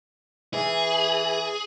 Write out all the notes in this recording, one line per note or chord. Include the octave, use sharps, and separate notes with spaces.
E3 G#4